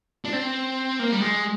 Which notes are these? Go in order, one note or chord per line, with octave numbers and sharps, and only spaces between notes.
D4
C4
A#3
G3
G#3